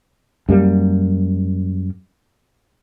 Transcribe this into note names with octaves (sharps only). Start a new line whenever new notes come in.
F#2 G3 A#3